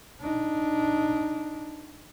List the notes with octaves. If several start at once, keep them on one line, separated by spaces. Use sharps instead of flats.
D4 D#4